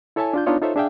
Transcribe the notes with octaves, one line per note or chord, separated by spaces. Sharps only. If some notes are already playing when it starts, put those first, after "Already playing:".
E4 A4 C#5 E5 G#5 A5
D4 F4 G6
B3 D4 D#4 F4 C#5 D#5
D#4 F4 A4 C5 C#5 E5
D4 G#4 E5 F5 G5